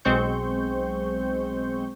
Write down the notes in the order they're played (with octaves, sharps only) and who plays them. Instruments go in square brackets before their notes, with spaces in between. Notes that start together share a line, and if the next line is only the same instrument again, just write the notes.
[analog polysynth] B1 G#3 C4 C5 C#6 G6